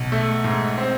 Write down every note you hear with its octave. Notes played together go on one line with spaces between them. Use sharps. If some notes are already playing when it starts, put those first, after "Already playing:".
Already playing: B1
A3
G#2
C4